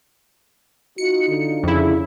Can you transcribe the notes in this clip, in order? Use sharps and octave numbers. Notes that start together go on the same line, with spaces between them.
D#4 F4 F#4 C#7
D3
F2 C#3 E4